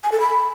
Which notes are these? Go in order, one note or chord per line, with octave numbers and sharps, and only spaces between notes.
G#5
A4
B5